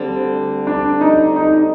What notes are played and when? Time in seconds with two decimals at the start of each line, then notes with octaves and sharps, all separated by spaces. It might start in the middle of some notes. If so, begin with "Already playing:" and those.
Already playing: D2 D3 G3 C4
0.67 D4
1.01 D#4
1.36 D#4